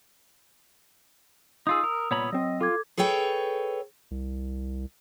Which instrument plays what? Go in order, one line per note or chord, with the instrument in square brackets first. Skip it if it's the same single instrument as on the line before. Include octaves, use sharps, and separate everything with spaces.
[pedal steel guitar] D#4 F4 G#4 [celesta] D#6 E6
[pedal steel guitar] A#4
[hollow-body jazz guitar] C2 A#2 A#5 [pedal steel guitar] B3 C#5 B5
[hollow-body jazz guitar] F#3 C4 [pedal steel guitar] D#5
[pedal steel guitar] F4 [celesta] A4 D6 G#6
[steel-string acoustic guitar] G#4 A4 B4 C#5 G5
[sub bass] C2